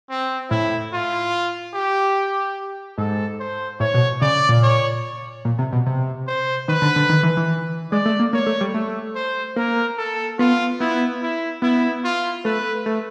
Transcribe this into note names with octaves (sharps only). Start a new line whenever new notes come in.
C4
A2 E4
F4
G4
G#2 A4
C5
A2 C#5
B2
C#3 D5
A#2
C#5
A#2
C3
B2
C3
C5
D#3 B4
D3
D3
D#3
E3
E3
G#3 D5
A3
A#3
A#3 C#5
A3
G3
A3
C5
A#3 A#4
A4
B3 F4
B3 E4
E4
B3 E4
F4
A3 B4
A3